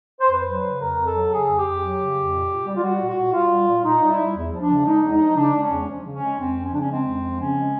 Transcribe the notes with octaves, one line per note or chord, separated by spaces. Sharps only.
C5
F2 B4
F#3
C#3
F2 A#4
F2
A4
F#3
C#3 G#4
F2
G4
F2
F#3
C#3
F2
A#2
A#2
G3
F4
G3 F#4
A#2
F#4
A#2
G3 F4
G3
A#2
A#2 D#4
G3
E4
G3
E2
F3
D4
C#3
G#3 D#4
E2
D#4
F3
C#3 D4
G#3
C#4
E2
F3
C#3
C#4
G#3
F2 C4
F3
C#4
C#3 D4
C#4
G#3 C4
F2
F3
C#3 C#4
G#3